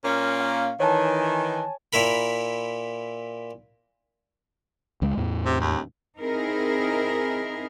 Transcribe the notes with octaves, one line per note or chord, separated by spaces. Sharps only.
A#2 A#3 C#4
F5
D#3 E3 C#5 G#5 A5
A#2 E4 A#4 B5
C#2 G#3
E2 A2
C3
D#2
C4 D#4 E4 G#4 A#4